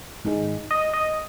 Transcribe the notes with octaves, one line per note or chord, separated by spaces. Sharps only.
G#2 D#3 G#3
D#5
D#5